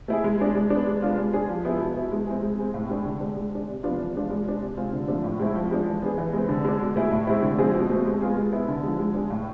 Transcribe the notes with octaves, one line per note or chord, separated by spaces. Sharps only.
A3 E4 G#4
G#3
D4 G#4
G#3
B3 D4
G#3
B3 D4 F4
G#3
D4 G#4
F3
B3 E4 G#4
B2
B3 E4
G#3
C4 E4 G#4
G#3
C4 G#4
A2
G#3 D4 G#4
D3
G#3 D4
G#3
D4 G#4
C3
F3 B3 D4 F4
E3
G#3 D4 F4
G#3
D4 G#4
C3
G#3 C4 F4 G#4
D3
F3 A3 D4
A2
G#3 C4 E4
F3
G#3 D4
E3
B3 D4 G#4
E3
G#3 C4
D3
G#3 D4
B2
A3 E4 G#4
A2
G#3 C4 E4
D3
F3 G#3 C4 G#4
B2
A3 C4
G#3
B3 F4 G#4
G#3
B3 E4
D3
F3 G#3
G#3
D4 G#4
A2